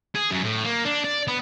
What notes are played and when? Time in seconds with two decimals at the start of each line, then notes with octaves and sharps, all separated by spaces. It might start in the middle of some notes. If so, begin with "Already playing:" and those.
0.15 G#4
0.32 F#2
0.44 A2
0.65 A#3
0.85 D4
1.05 D5
1.28 B3